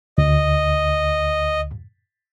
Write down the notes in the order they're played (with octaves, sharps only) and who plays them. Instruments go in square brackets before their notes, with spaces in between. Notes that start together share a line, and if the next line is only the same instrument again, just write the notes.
[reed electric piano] D2 [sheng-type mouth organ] D#5